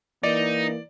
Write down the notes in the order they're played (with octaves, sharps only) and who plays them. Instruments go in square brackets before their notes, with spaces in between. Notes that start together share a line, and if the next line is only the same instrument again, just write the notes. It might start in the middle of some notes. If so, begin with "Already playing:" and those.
[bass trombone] E3 [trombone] A#3 [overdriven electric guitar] D#4 [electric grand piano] D5